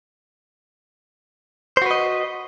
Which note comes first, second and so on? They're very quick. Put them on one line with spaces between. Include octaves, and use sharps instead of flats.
C5 F#4 B4 D#5